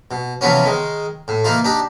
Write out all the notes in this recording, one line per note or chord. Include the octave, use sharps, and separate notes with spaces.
B2
C3 E3 F3 B3 C#4
D#3 G#3
A2
E3 A#3 D#4 F4
D4 D#4 G4